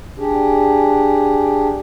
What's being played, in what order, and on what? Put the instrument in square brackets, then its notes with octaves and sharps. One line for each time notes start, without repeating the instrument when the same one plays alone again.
[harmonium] D4 G4 G#4